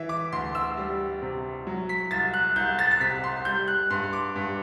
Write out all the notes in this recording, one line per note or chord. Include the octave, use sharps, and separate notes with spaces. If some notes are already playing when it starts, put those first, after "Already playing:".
Already playing: E3 E5
D6
D2 C6
E6
G3
C3
F#3
B6
C2 A6
F#6
C2 G6
A6
A6
C3 B6
C6
G3 G6
F#6
G2 C6
D6
G2